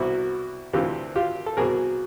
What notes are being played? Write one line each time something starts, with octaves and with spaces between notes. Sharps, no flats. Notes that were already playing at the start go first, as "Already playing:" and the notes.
Already playing: C2 B2 E4 F#4
D2 C3 E3 F4 G4
F4 G4
A4
C2 B2 G#4 A#4